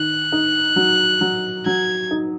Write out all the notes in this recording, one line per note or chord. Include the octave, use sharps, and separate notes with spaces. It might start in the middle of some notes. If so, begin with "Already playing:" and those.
Already playing: D#3 F#6
D#4
F#3
F#3
F#3 G#6
D#4